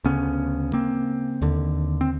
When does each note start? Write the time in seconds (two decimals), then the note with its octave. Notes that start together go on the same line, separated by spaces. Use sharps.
0.04 D2 C#3 B3 C#4
0.73 A#3 C4
1.42 D#2 D3
2.01 C4